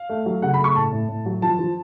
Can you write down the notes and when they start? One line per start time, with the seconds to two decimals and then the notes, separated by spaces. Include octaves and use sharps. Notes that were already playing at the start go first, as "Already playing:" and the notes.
Already playing: F5
0.09 A3
0.26 F#3
0.42 C#3 F#5
0.54 B5
0.59 A3 C#6
0.75 A2 A5
0.92 A2
1.09 A2
1.26 F#3
1.42 F3 A5
1.59 F3